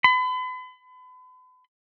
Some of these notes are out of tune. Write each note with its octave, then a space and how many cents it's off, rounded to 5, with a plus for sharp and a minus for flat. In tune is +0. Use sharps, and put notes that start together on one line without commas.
B5 +40